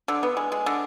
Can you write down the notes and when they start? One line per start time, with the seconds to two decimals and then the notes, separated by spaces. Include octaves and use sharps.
0.08 D3
0.23 B3
0.37 G#3
0.52 G#3
0.66 D3